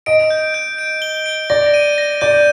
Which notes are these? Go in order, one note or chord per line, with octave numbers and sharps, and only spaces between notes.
D#5 D7
G6
G6
D7
G7
D7
D5 A#6
D#7
A#6
D5 G6